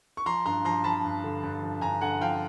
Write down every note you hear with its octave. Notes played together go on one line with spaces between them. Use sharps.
C#6
F3 A#5 C6
G2 A#5 C6
F3 A#5 C6
F3 A5 B5
G2
D3
G2
F3
G2 G#5 A#5
D3 F#5 G#5
F3 F5 G5